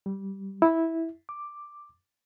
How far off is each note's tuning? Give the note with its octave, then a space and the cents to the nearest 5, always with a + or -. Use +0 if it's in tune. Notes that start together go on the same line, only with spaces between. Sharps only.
G3 -10
E4 -10
D6 +5